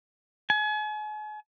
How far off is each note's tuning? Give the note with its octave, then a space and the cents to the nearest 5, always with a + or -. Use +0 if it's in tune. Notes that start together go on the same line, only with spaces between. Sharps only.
G#5 +40